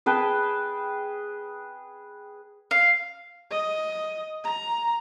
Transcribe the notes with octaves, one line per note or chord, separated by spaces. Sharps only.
G#4 B4 G5 A5
F5
D#5
A#5